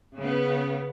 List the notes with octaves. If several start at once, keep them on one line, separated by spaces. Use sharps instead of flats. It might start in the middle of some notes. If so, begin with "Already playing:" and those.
C#3 B3